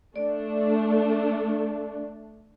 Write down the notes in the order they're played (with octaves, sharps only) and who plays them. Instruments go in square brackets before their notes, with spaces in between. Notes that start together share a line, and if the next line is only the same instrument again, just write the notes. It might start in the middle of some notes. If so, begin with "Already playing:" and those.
[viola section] A3 D4 [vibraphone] D5